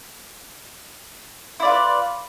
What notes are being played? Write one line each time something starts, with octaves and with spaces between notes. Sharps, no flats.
E4 F4 B4 D5